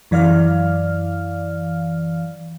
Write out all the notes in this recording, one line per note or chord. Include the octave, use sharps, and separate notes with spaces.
F#2 E3 D5 F5 F6